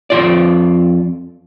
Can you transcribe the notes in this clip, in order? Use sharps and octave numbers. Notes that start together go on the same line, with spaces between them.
F2 F4 D5